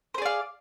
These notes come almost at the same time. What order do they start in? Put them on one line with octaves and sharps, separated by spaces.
C5 G#4 D5 F5